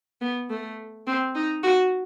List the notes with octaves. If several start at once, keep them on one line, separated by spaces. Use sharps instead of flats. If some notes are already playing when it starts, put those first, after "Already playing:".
B3
A3
C4
D#4
F#4